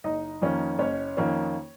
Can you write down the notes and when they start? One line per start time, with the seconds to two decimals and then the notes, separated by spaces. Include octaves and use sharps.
0.04 F#1 D#4 D#5
0.42 F2 D#3 A#3 C#4
0.79 F#1 C#4 C#5
1.17 F2 D#3 A#3 C#4